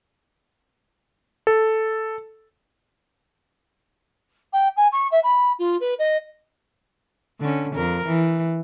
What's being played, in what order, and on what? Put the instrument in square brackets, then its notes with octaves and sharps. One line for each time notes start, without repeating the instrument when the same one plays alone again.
[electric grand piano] A4
[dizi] G5
G#5
C#6
E5
B5
F4
B4
D#5
[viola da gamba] D3 C#4
F2 A#4
E3